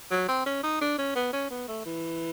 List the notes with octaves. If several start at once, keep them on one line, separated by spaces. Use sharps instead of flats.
F#3
C4
C#4
D#4
D4
C#4
B3
C#4
B3
A3
E3